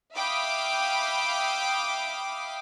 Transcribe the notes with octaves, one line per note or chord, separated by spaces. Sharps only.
E5 F5 G5 B5 D6 D#6